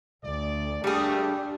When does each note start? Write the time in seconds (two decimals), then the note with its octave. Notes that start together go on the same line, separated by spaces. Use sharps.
0.24 D2 D5
0.84 G3 A3 A#3 D4 G4 G#4